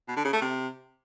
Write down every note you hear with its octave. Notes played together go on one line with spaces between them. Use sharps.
B2
D3
C#3
A3
C3